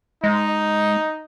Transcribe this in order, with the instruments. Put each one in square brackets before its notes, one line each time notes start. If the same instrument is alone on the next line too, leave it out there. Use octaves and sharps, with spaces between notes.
[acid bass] G#3 [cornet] D#4